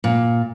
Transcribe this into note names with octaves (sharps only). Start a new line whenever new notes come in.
A#2